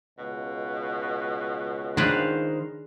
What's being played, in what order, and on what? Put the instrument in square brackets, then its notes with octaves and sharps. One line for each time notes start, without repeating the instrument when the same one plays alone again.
[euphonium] C#2 [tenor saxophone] B2
[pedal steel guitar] D#3 C5 F5 [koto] D4 G#4 B4